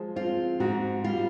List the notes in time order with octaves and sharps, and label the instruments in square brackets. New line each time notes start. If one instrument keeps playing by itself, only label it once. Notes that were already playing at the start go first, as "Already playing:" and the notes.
Already playing: [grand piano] F3 G#3
[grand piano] C4 [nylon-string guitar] F4
[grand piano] G#2 [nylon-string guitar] F#4
[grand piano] G3 [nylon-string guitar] F4